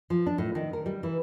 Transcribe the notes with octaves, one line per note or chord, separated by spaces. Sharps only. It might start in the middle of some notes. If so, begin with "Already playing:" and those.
F3
D4
A2
D#3
A#4
G3
E3